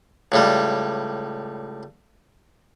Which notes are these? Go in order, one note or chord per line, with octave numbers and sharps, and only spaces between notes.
C#2 A2 G3